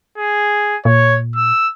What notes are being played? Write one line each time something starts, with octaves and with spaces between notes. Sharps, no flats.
G#4
A#2 C#5
E6